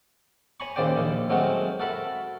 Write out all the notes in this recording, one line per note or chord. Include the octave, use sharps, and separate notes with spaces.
C#5 G#5 A#5 B5 C#6
D#2 A#2 C#3 C5 D5 G5
A#1 D#2
F#3 G#3 A3 C4 F#4 A#4
F#4 A4 A#4 E5 B5